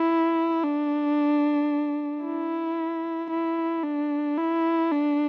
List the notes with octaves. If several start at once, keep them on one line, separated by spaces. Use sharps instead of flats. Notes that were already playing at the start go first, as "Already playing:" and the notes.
Already playing: E4
D4
E4
E4
D4
E4
D4